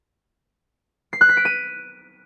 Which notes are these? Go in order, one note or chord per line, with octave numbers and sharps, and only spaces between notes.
C7
F#6
B6
D7
D#7